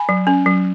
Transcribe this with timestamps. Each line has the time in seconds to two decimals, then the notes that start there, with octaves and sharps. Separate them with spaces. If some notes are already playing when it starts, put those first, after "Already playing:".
Already playing: G#5 B5
0.09 F#3
0.27 C#4
0.46 F#3